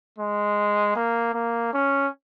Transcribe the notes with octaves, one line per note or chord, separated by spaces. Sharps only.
G#3
A#3
A#3
C#4